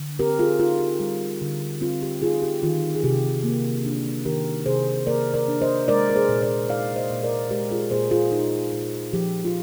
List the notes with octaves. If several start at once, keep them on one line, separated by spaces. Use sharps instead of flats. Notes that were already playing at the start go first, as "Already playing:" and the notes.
Already playing: D3
C4 G4 A#4
F4 G#4
D#4 F4
G4
G3
D3
C4 F4
G4
D#4 F4 G#4
G4
D#3 F4
G#4
C3 G4
A#3
D4
D#3 G4 A#4
C3 G#4 C5
A#3 A#4 D5
A#4 D5
D4
C5 D#5
G#3 A#4 D5
A#4
G#4 C5
A#2
A#4 D5
D#4 D5 F5
C5 D#5
A#2
A#4 D5
G#3 G4 A#4
F4 G#4
A#2 G#4 C5
F4 G#4
D#4
A#2
F3 G4
F4